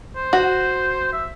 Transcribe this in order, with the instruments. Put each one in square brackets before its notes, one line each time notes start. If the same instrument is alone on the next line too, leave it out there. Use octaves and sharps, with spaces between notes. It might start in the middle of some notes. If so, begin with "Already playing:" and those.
[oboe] C5
[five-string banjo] F#4
[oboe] E5